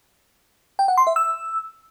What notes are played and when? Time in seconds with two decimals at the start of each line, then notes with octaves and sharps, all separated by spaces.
0.79 G5
0.88 F#5
0.97 C6
1.07 E5
1.16 E6